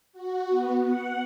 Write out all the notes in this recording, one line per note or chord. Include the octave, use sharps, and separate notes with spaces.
F#4
B3
F#5